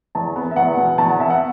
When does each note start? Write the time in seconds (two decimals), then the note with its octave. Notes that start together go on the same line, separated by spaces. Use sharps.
0.15 E2 A5
0.36 B3
0.51 E5
0.56 E2 F#5
0.77 B2
0.98 E2 A5
1.09 F#5
1.19 B3 E5
1.30 F#5